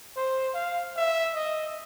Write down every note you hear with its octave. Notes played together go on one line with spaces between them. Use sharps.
C5
F5
E5
D#5